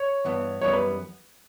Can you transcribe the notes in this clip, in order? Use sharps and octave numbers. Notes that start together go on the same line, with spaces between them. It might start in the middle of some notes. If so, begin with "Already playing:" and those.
Already playing: C#5
G2 E3 B3
F#2 E3 G3 B3 C#5
B4